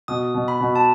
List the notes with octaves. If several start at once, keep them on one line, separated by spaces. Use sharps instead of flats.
B2 D#6
B2
B5
B2
A5